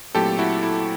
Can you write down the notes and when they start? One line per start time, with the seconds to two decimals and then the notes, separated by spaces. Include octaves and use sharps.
0.14 A#2 F#3 A3 C4 E4 G4 A4
0.39 E4 F#4
0.63 E4